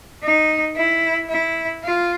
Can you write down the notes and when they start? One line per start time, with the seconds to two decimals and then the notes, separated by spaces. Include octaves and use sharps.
0.23 D#4
0.76 E4
1.30 E4
1.84 F4